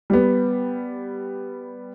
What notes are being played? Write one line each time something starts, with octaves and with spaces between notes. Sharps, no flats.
G3 B3